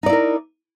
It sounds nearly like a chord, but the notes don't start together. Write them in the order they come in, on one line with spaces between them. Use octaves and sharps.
D#4 D5 E4 A#4